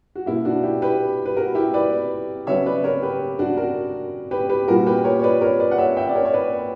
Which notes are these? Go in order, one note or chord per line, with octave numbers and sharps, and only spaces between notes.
F#4
B2 A#3 E4
D4 F#4
E4 G4
G4 B4
B4
F#4 A#4
E4 G4
B4 D5
C#3 F#3 B3 C#5 E5
B4 D5
A#4 C#5
G4 B4
D4 F#4
F#4 A#4
G4 B4
G4 B4
A#2 G3 B3 F#4 A#4
G4 B4
A#4 C#5
C#5
B4 D5
A#4 C#5
B4 D5
F#5
C#5 E5
E5 G5
D5
A#4 C#5
C#5
B4 D5